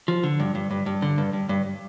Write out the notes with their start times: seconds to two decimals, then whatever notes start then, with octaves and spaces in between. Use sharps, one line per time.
0.08 F3
0.24 D3
0.40 G2
0.55 G2
0.71 G2
0.86 G2
1.02 D3
1.18 G2
1.33 G2
1.49 G2